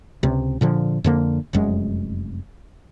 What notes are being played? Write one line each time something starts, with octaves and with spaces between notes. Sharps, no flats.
C#2 C3
A#2 D3 F3
F2 D3 A#3
F1 F#2 G#3